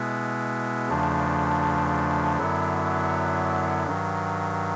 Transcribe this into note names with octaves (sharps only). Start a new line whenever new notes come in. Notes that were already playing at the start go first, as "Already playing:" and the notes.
Already playing: B2 G#3 B3 E4
E2 C#3 F3 A3 D4
F#2 D3 F#3 B3 E4
G2 D#3 F#3